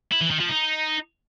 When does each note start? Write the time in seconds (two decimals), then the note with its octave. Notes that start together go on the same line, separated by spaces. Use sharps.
0.12 E4
0.21 E3
0.30 D#3
0.40 F3
0.49 D#4